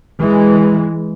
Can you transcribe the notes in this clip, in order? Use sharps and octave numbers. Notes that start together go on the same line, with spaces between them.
E3 G#3